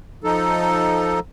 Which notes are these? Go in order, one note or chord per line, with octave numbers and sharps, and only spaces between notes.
F3 D#4 A4